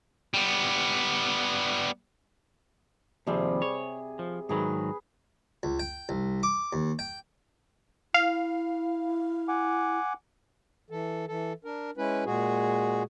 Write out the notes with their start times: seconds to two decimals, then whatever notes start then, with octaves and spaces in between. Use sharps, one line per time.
0.34 G3 B3
3.27 D#2 C3 F3 G3 C4 G#4
3.62 G#4 C#5
4.19 F3
4.49 G#2 D#3 F#3 G#4 B4
5.63 C#2
5.80 G5
6.09 C2
6.43 D6
6.73 D#2
6.99 G5
8.14 E4 F5
9.48 F#5 G#5 D6
10.90 E3 A4
11.28 E3 A4
11.65 D4 A#4
11.97 G#3 C#4 E4 B4
12.25 A#2 G#3 F#4 G#4